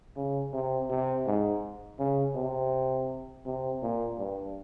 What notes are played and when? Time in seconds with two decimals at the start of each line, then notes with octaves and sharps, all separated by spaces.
0.16 C#3
0.53 C3
0.90 C3
1.27 G#2
1.99 C#3
2.35 C3
3.45 C3
3.82 A#2
4.18 G2